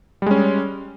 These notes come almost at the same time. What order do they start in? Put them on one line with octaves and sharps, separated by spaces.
G3 G#3 C#4